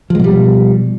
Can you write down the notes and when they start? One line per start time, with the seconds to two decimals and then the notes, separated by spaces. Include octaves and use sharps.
0.10 F3
0.15 G#3
0.19 B2
0.24 G3